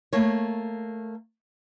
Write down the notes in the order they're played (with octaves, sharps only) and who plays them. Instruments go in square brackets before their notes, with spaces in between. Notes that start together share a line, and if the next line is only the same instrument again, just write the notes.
[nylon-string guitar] A3 A#3 C#5